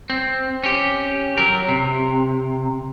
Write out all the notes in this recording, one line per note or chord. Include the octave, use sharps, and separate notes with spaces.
C4
C#4 G4
F#3 A#4
C3